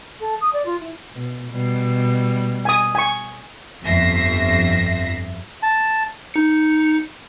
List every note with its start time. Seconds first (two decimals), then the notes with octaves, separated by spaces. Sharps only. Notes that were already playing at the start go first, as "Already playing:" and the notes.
0.19 A4
0.40 D#6
0.53 D5
0.65 F4
0.79 E4
1.14 B2
1.51 B2 G3
2.65 G#5 D#6
2.95 G#5 C#6
3.84 G1 F2 E5 A#6 C7
5.63 A5
6.34 D#4 C#7